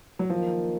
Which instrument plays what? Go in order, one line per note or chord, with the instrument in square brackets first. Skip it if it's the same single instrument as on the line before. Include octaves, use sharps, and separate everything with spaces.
[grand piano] F#3
[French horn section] D#3 A#3 F4 A#4 [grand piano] F3